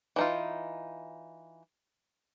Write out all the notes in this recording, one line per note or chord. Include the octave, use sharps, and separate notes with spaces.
E3 D#4 F4